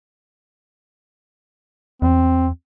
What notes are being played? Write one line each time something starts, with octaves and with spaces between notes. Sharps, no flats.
E2 C4